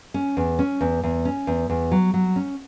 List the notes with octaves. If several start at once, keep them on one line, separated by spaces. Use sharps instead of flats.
C#4
E2
C#4
E2
E2
C#4
E2
E2
F#3
F#3
C#4